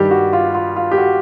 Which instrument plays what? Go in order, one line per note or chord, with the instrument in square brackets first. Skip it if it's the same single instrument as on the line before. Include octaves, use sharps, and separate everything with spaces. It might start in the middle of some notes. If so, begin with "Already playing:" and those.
Already playing: [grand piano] G2 D#3 G3 G4
F#4
F4
F4
F4
G4
F#4